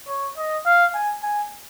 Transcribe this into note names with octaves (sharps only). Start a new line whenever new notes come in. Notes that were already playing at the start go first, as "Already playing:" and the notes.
C#5
D#5
F5
G#5
G#5